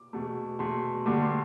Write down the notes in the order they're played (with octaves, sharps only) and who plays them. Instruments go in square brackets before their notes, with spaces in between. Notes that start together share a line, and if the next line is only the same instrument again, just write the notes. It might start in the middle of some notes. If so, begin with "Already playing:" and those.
Already playing: [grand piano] D6
E2 B2 A3
E2 B2 A3 C6
G2 D3 A3 D6
C6